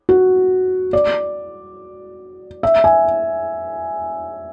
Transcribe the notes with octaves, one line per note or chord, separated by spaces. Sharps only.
F#4
D5
E5
G#5